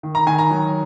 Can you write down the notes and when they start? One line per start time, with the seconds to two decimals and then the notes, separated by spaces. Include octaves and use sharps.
0.03 D#3
0.15 A#5
0.26 D#3 G#5
0.38 A#5
0.51 F#3